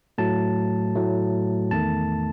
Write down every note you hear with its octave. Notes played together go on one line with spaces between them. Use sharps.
A2 F#3 A3 A5
A2 F#3 A3
E2 D#3 A3 A5